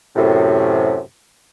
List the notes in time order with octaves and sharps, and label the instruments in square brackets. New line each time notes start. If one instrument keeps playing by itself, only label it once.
[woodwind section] F#2 A2 C3